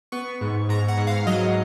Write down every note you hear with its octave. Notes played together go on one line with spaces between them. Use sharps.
B3 C#6
G#2
G#2 A#5
F#5
G#2
F5
F#3 D#5